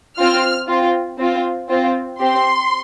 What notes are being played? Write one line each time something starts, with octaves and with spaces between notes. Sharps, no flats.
C4 F4 F6
C4 F4
C4 F4
C4 F4
C4 G4 C6